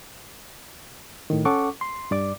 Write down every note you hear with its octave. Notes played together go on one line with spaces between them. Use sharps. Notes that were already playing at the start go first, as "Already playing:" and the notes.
A2 D#3
C#4 A4 F#5 C#6 D6
C6
G2 D5 D6